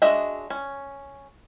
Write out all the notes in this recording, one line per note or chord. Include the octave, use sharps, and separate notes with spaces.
G#3 D4 F#4 D#5 E5
C#4